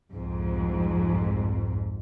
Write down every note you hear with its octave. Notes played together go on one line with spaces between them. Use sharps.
C2 F2 G#2